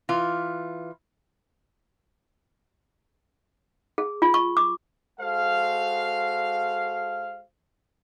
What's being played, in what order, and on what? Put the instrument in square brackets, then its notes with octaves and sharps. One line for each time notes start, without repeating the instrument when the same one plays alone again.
[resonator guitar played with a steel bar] E3 F4
[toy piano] G#4
F4
C#6
D6
[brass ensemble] G#3 F#4 A4 C5 F5